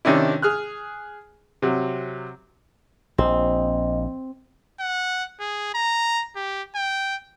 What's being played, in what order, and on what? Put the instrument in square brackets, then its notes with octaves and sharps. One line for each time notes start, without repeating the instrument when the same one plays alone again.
[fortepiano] C3 D#3 C#4 D4 E4
G#4 F6 F#6
C3 F#3
[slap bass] A#1 [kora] C4 [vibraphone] D#5
[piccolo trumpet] F#5
G#4
A#5
G4
G5